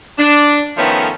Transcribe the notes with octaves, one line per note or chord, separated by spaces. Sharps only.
D4
D#3 F3 A3 B3 C#4 A4